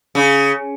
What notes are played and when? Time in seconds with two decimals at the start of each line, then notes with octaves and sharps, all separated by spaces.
0.15 C#3